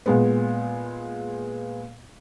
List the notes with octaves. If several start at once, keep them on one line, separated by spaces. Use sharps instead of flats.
A#2 G#3 B3